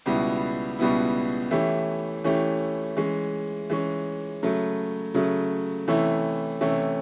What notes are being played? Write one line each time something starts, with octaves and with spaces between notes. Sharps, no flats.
C#2 B2 G3 B3 E4
C#2 B2 G3 B3 E4
E3 A3 C#4 E4 G4
E3 A3 C#4 E4 G4
E3 G#3 C#4
E3 G#3 C#4
C#3 F#3 A3
C#3 F#3 A3
C3 E3 A3 C#4 E4
C3 E3 A3 C#4 E4